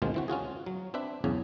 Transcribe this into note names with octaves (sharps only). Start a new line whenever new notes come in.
D2 B2 D#3 G#3 C4 F4
E3 C4 F#4
C#4 F4 F#4 G#4
F#3
C4 D4 B4 E5
B1 E2 C#3 C#4 G#4 G#5